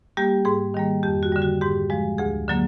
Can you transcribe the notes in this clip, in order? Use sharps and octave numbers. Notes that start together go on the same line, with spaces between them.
G3 A#3 G4
G#2 G#4
D#3 G3 A#3
F2 G4
F#4
D3 G3
F#4
G#2 G4
F3 G#3
D2 G#4
D3 F#3 A#3